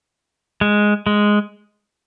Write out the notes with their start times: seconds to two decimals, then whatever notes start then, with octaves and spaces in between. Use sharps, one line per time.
0.61 G#3
1.07 G#3